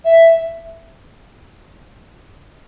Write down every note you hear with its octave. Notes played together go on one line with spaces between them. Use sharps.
E5